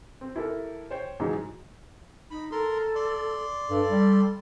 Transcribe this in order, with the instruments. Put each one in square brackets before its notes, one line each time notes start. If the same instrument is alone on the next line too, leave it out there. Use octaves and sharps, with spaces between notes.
[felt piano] C4
E4 G4 A4 A#4
C5 C#5 G5
G#2 E3 F#3 D#4 G#4
[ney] D#4 [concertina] B5
[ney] A4 [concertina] A#4 C6
[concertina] D5 C6
[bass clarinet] G2 [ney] A4
[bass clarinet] G3